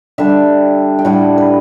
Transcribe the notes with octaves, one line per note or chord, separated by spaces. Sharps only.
D3 G3 D4 E5
G5
A2 G3 D4 F#5
B4